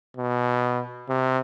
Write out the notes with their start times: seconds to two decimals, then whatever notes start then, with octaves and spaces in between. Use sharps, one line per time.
0.17 B2
1.09 C3